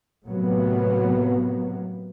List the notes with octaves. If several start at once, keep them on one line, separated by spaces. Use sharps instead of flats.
A2 C3 F#3 A#3 B3